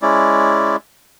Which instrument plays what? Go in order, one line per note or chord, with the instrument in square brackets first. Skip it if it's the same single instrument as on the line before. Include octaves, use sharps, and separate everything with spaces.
[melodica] G#3 C#4 E4 D5